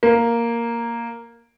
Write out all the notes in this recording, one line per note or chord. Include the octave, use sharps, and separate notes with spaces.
A#3